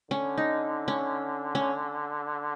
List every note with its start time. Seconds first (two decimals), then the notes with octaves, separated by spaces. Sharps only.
0.11 D3 C#4
0.38 D#4
0.88 C#4
1.55 C#4